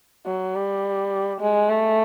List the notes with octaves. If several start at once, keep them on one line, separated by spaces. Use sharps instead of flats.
F#3
G3
G#3
A3